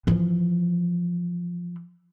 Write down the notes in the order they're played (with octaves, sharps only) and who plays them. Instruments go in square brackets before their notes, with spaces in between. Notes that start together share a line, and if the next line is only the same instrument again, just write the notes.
[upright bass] E3 F3